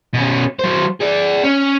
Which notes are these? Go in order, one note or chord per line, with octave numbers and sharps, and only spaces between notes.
B2 C#4
F#3 C5
G#4 D5
C#4